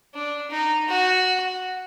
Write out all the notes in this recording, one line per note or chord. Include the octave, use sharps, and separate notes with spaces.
D4
D#4
F#4